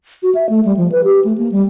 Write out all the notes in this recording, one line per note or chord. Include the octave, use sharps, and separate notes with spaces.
F#4
E5
A3
G3
F3
B4
G4
A3
A#3
G3